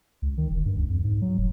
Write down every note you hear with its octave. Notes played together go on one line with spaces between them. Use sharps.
C#2
D#3
E1
G2
C#2
F2
G#2
F#3
F1